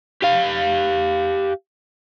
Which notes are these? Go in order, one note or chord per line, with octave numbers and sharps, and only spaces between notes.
G4 F5